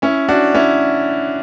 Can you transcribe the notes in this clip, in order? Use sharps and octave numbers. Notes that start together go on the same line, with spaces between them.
C#4 E4
D4 F#4
C#4 E4